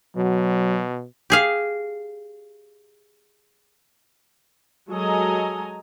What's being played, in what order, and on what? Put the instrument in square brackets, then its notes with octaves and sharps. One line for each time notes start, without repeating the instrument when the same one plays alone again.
[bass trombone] B2 [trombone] F#3
[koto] G4 G#4 F5
[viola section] F#3 G#3 A4 D#5 G#5 A#5